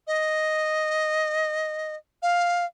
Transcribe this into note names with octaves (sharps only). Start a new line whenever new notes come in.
D#5
F5